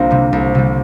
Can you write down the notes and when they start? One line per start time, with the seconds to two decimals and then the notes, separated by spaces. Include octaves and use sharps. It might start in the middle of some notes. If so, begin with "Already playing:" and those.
Already playing: C2 A#3 C4 D4 F4
0.11 C3 G3
0.33 C2
0.55 C3 G3